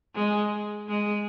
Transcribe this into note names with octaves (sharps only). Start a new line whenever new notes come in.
G#3
G#3